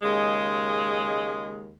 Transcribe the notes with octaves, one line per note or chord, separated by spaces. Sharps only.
D#2 C#3 G#3